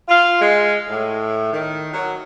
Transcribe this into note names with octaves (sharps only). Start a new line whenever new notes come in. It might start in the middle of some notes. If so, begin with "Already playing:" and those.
F4
G#3
A2
D#3
F#3